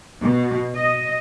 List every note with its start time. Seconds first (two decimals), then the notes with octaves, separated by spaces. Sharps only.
0.22 B2
0.75 D#5